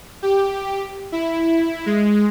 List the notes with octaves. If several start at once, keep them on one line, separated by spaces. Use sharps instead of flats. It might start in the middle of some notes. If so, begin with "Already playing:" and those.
G4
E4
G#3